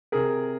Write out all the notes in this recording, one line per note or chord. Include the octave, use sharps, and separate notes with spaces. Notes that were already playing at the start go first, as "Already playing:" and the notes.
C3 G#4 A#4